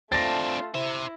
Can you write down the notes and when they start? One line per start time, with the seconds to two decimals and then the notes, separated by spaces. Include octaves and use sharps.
0.12 A3 C4 D4 F4 A6 A#6
0.75 E4 C5 E5